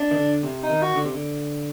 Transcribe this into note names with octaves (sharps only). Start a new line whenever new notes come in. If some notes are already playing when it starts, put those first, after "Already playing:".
Already playing: D4
D#3
D3
C3
D#4
D#3
F#4
D3
C3
D3